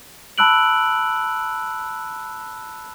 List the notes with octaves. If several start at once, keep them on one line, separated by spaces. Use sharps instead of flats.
A5 B5 E6 F#6 D7 F#7